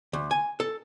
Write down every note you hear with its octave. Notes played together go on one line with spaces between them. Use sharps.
D2
G#5
A4